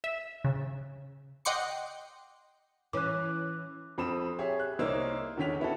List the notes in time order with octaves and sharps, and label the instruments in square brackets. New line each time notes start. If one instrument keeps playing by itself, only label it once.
[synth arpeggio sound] E5
C#3
D#5 F#5 G5 C6 D6 C#7
[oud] E3 C#4 [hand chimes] D6 F#6
[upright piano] F2 C4 B5 D#6 E7
G4 G#4 C#5 E5
F#6
C2 A#3 D#4 C5 C#5 E6
E2 D3 D#3 C#4 B6 F7
B3 E4 F#4 A4